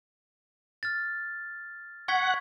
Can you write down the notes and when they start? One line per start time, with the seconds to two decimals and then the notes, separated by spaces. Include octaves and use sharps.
0.83 F6 A6
2.08 F#5 C#6 G#6 B6